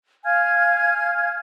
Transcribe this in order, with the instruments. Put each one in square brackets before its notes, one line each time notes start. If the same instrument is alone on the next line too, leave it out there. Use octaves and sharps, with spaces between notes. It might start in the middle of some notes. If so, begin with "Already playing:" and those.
[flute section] F5 G#5 F6 G#6